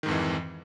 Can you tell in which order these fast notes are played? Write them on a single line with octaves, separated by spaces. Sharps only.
D#3 G#2 F2 E3